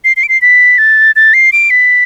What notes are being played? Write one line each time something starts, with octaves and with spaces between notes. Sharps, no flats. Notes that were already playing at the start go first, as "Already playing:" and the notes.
C7
C7
D7
C7
B6
A6
A6
C7
D7
B6